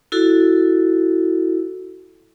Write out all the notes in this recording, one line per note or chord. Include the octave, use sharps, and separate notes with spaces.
E4 F#4 A4